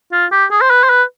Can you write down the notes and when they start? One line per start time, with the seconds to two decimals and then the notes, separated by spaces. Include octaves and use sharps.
0.12 F4
0.32 G4
0.51 G#4
0.61 C5
0.70 B4
0.83 C5
0.90 B4